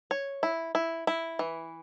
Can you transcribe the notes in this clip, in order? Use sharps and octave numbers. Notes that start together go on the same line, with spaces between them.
C#5
E4
E4
E4
E3